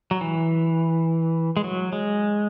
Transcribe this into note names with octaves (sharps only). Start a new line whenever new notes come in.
F#3
E3
G#3
F#3
G#3